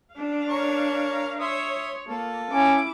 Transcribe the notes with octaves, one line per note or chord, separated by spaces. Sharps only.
D4 F5
A#4 C#5
C#5 E5 C6 D#6
A#3 F4 A4
C#4 E4 D6